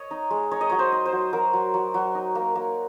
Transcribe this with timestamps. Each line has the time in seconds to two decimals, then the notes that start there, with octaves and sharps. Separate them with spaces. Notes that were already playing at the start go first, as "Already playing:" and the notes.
Already playing: C#5 D#5
0.11 D#4
0.31 G#3
0.51 D#4 C#5
0.61 D#5
0.70 F#3 C#5
0.79 C5
0.92 D#4
1.06 C5
1.12 F#3
1.33 F#3 A#4
1.53 F#3
1.74 F#3
1.94 F#3
2.15 D#4
2.35 A#3
2.55 A#3